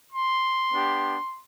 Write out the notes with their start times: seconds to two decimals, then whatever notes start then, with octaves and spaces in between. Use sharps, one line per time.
0.11 C6
0.73 B3 D4 G4